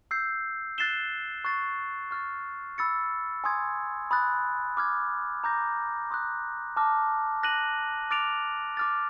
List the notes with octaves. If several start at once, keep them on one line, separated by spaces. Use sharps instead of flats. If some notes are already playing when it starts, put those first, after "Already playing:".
E6 G6 C7
F#6 A6 C7 E7 G7
C#6 F#6 A6 C7
C#6 F6 A6
B5 E6 A6 C#7
G#5 C6 D#6 G#6
B5 D#6 F#6 A6
D6 F6 G#6
A#5 D6 G6 A#6
C6 D#6 F#6
A5 D6 F6 A#6
F#6 A#6 D#7 F#7
D6 F6 A6 D7 F7
D6 F6 A6